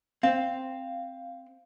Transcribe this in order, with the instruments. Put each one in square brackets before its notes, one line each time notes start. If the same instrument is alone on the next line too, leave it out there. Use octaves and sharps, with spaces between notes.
[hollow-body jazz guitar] C4 [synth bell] F5